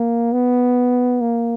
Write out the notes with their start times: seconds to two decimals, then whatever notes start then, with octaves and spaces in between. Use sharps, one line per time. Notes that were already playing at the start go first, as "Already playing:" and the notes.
Already playing: A#3
0.32 B3
1.21 A#3